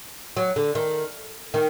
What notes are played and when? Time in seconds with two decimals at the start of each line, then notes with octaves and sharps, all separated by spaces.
0.37 F#3
0.56 D3
0.75 D#3
1.54 D#3